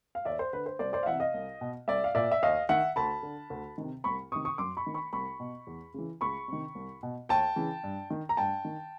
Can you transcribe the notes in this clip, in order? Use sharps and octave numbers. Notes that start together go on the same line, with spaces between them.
F5
D#2 D5 E5
C5
D3 B4
C5
C2 C5 D5
C5 D5
F5
C3 E3 E5 F#5
D#5 F5
C2
B2
C2 D5 E5
F5
A#2 D5 E5
E5
D#2 D#5 F5
D#3 E5 F#5
D2 A5 B5
D3
D2
C3 D#3
C2 B5 C#6
C3 D#3 C#6 D#6
C#6 D#6
F#2 C6 D6
B5 C#6
D#3
B5 C#6
C2 B5 C#6
B2
E2
C#3 E3
C#2 B5 C#6
C3 D#3
C2
B2
D#2 G5 A5
C#3 E3
G2
D#3
A#5
G2 G5 A5
D#3